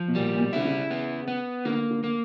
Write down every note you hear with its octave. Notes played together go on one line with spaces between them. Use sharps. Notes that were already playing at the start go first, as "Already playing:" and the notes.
Already playing: F3
B2
A#2 G3
A#2
B2
D3 E4
C#3
B3
B3
D3 A#3
D3
A#3